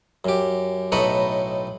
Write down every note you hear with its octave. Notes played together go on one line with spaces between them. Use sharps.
F#2 G4
B1 A2 D#4 A4 B4 C#6